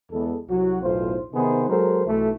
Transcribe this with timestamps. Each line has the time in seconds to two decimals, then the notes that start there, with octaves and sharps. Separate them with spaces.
0.12 E2 G#3 B3 A4
0.49 C2 F#3 F#4
0.82 B1 E2 A2 F4 C5
1.33 C3 D#3 B3 D#4 G#4 C5
1.69 F#3 G#3 A4 A#4 C5
2.06 B1 E3 A3